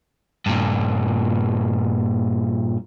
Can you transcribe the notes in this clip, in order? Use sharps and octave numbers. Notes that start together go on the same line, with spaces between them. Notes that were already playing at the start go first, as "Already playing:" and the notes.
G2 A#2